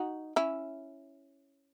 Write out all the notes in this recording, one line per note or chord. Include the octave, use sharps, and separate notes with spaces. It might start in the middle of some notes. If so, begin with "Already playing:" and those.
Already playing: D#4 F#4
C#4 E4